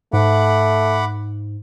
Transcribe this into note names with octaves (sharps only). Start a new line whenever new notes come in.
G#2 A3 F#5 B5 D6